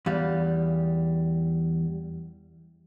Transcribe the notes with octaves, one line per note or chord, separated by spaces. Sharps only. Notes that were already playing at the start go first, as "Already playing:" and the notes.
E2 G3 F5